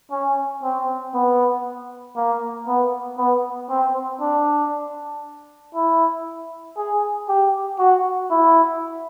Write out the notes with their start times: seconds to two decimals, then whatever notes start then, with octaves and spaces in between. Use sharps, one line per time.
0.12 C#4
0.63 C4
1.14 B3
2.17 A#3
2.67 B3
3.18 B3
3.70 C4
4.21 D4
5.75 E4
6.77 G#4
7.28 G4
7.79 F#4
8.31 E4